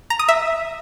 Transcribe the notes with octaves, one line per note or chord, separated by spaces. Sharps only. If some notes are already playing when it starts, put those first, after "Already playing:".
A#5
D#6
E5